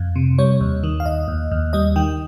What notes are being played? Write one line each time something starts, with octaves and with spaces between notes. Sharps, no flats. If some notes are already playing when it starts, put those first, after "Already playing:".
Already playing: F2
C3
G3 C#5
D#2
D#3
F5
D#2 D#5
D#2
D#2
G3 D#5
D#3 G5